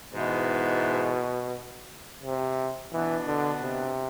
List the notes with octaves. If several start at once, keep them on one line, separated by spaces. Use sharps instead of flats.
G#2 B2 E3 B3
C3
B2 E3 B3 D4
D3
C3